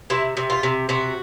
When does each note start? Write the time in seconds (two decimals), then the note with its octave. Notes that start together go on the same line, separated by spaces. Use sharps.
0.10 C3 E4
0.37 C3
0.50 F4
0.63 C3
0.89 C3 F#4